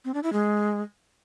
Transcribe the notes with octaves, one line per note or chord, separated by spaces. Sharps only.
C4
D4
E4
G#3